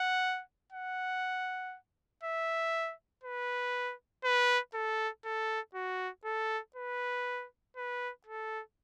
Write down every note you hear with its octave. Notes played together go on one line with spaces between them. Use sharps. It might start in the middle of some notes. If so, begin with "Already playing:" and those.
Already playing: F#5
F#5
E5
B4
B4
A4
A4
F#4
A4
B4
B4
A4